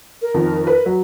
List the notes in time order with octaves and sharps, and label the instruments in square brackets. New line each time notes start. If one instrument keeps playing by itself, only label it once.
[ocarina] A#4
[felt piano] F2 D#3
B4
F#3